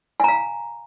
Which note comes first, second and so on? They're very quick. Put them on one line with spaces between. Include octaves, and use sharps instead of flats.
G#5 A#5 F5